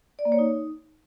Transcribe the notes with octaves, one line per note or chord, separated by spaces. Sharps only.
D5
A#3
C#5
D#4